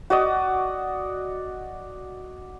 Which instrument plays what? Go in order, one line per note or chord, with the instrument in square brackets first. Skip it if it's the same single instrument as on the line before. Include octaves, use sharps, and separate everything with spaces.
[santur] F#4 D5 D#5